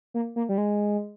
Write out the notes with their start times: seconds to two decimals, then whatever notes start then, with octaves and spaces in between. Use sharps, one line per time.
0.14 A#3
0.36 A#3
0.49 G3
0.58 G#3